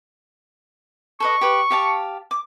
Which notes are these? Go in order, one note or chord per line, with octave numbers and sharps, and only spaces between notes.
A4 B4 D#5 C#6
G4 B4
G4 F5 A5
D6